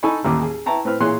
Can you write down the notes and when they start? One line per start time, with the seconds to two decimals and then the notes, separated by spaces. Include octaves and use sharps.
0.03 D#4 A4 G#5 A5 B5 C#6
0.25 A1 D#2 D6
0.41 G#4
0.66 E4 B4 G5 A5 A#5 C#6
0.85 A2 C4 B4 F6
1.00 A#2 E3 G#4 C#5 C6 F#6